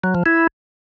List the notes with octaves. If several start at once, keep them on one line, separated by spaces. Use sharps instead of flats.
F#3
F3
E4